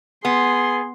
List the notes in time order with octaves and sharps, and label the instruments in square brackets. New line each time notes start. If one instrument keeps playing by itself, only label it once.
[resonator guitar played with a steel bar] B3 [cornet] G#4 [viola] C6